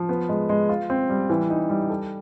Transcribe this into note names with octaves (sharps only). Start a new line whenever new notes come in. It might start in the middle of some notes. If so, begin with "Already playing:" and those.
Already playing: F3
B3
G#3
G#3
F4
C4
G3
E3
D#4
G3
A4